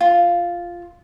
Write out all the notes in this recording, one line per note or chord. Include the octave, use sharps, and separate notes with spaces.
F4